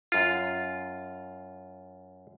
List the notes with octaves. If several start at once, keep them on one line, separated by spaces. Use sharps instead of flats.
F#2 F4